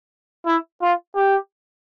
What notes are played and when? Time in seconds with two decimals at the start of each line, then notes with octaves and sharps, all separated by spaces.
0.46 E4
0.82 F4
1.15 G4